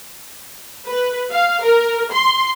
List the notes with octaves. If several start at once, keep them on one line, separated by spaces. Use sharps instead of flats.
B4
F5
A#4
C6